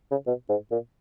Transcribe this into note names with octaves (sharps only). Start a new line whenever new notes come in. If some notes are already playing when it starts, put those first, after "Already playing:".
C#3
B2
G#2
A#2